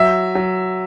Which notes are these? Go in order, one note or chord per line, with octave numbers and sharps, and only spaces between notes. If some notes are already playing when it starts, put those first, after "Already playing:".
Already playing: F#3 E5
F#3